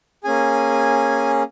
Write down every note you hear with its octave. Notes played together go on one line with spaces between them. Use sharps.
A#3 C#4 G#4 G#5